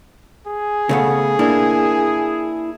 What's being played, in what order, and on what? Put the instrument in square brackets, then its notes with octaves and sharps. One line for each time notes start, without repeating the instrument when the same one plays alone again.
[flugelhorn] G#4
[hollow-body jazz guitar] C#3 A3 B3
A#3 D4 E4